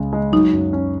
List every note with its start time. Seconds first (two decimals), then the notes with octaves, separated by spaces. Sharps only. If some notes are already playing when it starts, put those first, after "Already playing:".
Already playing: C#2 C#3 G#3
0.13 G#3
0.32 F#3 D#4
0.53 F#2
0.73 C#4